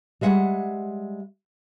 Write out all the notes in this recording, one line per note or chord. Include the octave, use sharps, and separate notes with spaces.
G3 G#3 E5 F#5